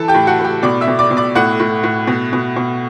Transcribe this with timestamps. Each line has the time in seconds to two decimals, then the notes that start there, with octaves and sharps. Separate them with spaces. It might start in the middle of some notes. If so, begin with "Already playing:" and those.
Already playing: E3 A4 A5
0.08 G4 G5
0.14 A2
0.27 F#4 F#5
0.39 A2
0.44 G4 G5
0.63 B2 D5 D6
0.81 E5 E6
0.88 B2
0.99 D5 D6
1.11 B2
1.17 D5 D6
1.35 A2 F#5 F#6
1.60 A2
1.83 A2
2.07 B2
2.33 B2
2.56 B2